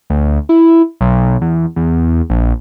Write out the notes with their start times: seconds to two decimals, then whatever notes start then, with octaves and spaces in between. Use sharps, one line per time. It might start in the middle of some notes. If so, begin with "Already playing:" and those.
0.10 D2
0.49 E4
1.01 B1
1.41 E2
1.76 E2
2.30 A#1